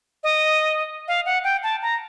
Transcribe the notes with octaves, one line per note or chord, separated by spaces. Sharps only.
D#5
F5
F#5
G5
A5
A#5